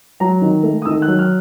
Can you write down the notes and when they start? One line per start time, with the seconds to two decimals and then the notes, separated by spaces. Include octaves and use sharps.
0.20 F#3 A#5
0.42 D#3
0.63 A3
0.82 D#6
0.85 D#3 E6
1.02 F#6
1.08 F#3
1.19 F6